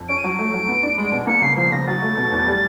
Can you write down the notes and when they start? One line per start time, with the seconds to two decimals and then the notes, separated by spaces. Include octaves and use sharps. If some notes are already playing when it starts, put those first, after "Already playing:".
Already playing: F2
0.09 C#4 D7
0.18 D#7
0.24 F#3 D7
0.39 A3
0.54 F#3
0.68 B3
0.83 D4
0.98 G#3
1.12 B2
1.27 A#3 C#7
1.42 C#3 C7
1.57 F3 C7
1.72 C#3 A#6
1.87 F#3 A6
2.02 A3
2.17 B2
2.32 E2
2.47 G3